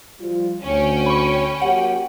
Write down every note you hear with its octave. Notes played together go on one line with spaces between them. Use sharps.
F3 G3 F4
D2 C#4 G5
B5 C#6
F#3 A#3 G4 F#5